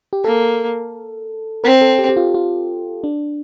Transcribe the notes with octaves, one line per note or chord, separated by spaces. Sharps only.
G4
A#3 A4
C4 A#4
A4
G4
G4
F4
F4
D4